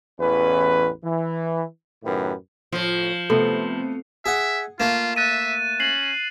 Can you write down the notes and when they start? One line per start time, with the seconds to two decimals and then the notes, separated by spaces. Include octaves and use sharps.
0.19 A1 E2 C#4 B4
1.03 E3
2.03 F#2 A2 D#3 G4 B4
2.72 A2 F3 F4
3.30 C3 A3 B3 A4 B4
4.26 G#4 E5 F#5
4.80 A3 A#3 F4 E7
5.16 E5 F#6 A6 D#7
5.80 C#4 C7 F#7